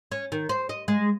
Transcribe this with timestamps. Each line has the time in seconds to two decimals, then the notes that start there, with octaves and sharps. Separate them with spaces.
0.12 C#4
0.32 D#3
0.49 C5
0.69 D#5
0.88 G#3